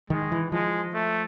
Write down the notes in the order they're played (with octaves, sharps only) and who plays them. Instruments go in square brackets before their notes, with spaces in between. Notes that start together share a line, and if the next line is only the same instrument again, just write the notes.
[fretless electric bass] D#3 [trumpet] G#3
[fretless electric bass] E3
[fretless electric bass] F3 [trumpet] G#3
[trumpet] A3